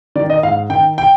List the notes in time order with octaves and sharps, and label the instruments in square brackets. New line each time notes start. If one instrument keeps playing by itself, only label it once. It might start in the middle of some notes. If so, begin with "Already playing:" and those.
[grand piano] D#3 D5
D#5
G#2 F5
D#3 G5
G5